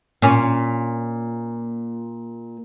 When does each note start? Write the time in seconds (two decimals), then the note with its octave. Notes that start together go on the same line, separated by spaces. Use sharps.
0.22 A#2 C#4